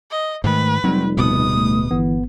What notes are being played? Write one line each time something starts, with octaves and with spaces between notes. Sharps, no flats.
D#5
G#2 D#3 A3 B4
F1 F#3 G3 C4 D#4
D1 B2 B3 D#6
A3
G1 E3 B3